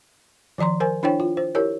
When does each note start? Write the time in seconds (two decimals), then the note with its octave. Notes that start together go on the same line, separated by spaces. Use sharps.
0.58 D#3 F3 D5 A#5 C6
0.80 A#4 C5 G#5
1.03 D4 E4 C5 C#5 G5
1.20 F4
1.37 C5
1.55 E4 G4 A#4 C#5